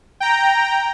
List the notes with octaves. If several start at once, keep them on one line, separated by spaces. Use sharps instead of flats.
G5 A#5